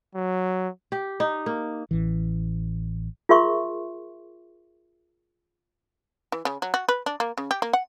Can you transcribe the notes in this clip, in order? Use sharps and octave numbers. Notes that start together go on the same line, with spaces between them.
F#3
G4
D#4
A#3
A1 E3
F4 G#4 A#4 E5 C6 C#6
E3
C#3
F#3
F#4
B4
D4
A#3
C#3
G4
A#3
F#5